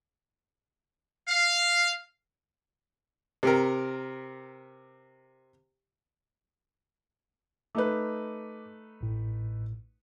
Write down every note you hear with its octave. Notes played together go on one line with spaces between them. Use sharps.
F5
C3 G4 A#4
A3 D#4 B4 D6
A1 A2